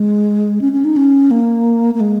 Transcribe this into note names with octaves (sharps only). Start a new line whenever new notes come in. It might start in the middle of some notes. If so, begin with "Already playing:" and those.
Already playing: G#3
C#4
C#4
D#4
C#4
A#3
A#3
G#3